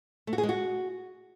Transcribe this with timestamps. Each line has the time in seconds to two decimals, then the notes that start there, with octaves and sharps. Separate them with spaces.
0.27 A3
0.33 F#4
0.38 G#4
0.43 G#3
0.49 F#4